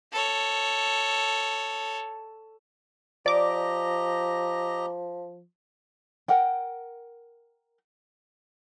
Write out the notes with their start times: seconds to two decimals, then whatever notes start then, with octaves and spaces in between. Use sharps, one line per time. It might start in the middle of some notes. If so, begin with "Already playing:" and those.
0.12 A4 C#5
3.26 F3 G4 D5 D#5 A#5 D6
6.28 A#4 F#5 G5